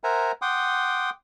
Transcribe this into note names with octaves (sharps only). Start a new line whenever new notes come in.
A#4 C5 E5 F#5 G#5 A#5
F#5 G5 C6 D6 D#6